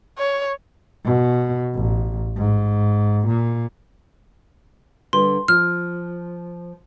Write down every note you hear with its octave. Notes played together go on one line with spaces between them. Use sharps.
C#5
B2
A1
G#2
A#2
D3 G3 B4 C6
F3 F6